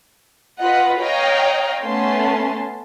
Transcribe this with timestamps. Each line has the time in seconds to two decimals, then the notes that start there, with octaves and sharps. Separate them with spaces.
0.59 F4 B4 D#5 F#5
1.00 C#5 D#5 F5 G5 A#5
1.82 A3 B3 C#4 A5 C6